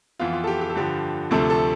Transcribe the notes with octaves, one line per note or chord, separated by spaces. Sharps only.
F2 E3 B3 F4
F4
A4
G4
G4
A4
G2 D3 F3 G4
D2 C3 F3 A3 A4
A4